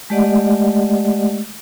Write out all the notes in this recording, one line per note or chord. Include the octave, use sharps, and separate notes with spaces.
G#3 A3 G4 D5 D#5 F#5